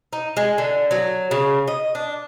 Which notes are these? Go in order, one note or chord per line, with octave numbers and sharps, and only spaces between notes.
D#4
G#3
D3
F#3
C#3
D#5
D4